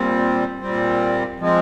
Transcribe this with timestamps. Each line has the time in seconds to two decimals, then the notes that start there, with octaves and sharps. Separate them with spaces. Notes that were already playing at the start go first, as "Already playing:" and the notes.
Already playing: A#2 G3 C4
0.60 A#2 G3 C4
1.40 F3 G#3 C4